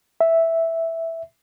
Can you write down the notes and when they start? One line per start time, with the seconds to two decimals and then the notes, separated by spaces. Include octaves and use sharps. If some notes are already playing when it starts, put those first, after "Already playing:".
0.21 E5